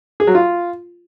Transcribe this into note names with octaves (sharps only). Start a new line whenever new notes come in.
G#4
F#3
F4